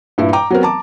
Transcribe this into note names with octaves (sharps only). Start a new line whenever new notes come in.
G2 A#2 E4
G5 A#5 D6
F#3 B3 C4 A#4
A5 A#5 D6